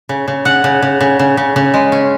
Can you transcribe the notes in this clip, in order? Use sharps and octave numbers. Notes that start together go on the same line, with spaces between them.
C#3
C#3
C#3 F#5
C#3
C#3
C#3
C#3
C#3
C#3
G#3
C#4